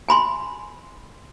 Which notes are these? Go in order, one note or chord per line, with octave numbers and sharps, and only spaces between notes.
G#5 B5 C6